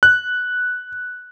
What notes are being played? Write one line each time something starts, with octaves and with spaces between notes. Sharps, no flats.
F#6